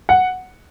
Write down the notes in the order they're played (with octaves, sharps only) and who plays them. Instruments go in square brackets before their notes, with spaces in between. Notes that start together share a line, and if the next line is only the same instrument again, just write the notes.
[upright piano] F#5